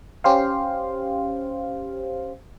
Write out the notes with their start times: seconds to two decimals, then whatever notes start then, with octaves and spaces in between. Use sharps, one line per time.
0.24 C#4 G4 C5 F5